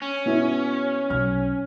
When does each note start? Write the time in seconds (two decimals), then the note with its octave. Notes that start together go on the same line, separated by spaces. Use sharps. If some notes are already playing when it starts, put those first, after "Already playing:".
0.02 C#4
0.26 B2 E4
1.10 B1 F6